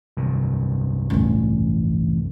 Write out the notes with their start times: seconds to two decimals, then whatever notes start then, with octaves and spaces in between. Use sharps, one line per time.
0.17 F1 C2 G2
1.10 A1 E2